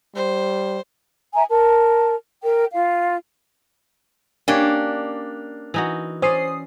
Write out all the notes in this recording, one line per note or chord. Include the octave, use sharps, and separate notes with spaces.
G3 C5
E5 G#5 A#5
A#4 A5
A#4 G5
F4 F5
A#3 C#4 D4 G4 C#5
E3 D#4 F#4
C#4 C5 D5 D#6 C7